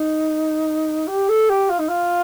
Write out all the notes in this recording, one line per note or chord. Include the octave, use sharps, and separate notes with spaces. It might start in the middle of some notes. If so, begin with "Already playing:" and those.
Already playing: D#4
G4
A4
G4
F4
D#4
F4